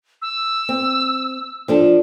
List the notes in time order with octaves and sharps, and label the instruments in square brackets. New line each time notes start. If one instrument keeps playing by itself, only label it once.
[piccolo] E6
[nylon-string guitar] C4
F3 D4 A4